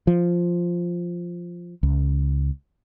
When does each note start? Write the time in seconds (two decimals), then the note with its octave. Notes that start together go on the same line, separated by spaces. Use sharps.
0.07 F3
1.83 C#2